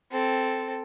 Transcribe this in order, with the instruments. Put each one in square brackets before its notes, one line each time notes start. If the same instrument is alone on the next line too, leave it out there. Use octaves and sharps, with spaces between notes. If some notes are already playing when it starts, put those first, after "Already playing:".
[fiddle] C4 A4